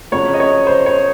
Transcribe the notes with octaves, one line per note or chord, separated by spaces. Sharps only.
F2 C#3 F#3 C#5
D#5
C#5
C5
C#5